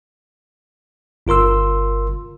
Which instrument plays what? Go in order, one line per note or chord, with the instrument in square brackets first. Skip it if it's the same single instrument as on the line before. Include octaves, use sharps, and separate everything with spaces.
[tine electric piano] G1 F4 A#4 C6 E6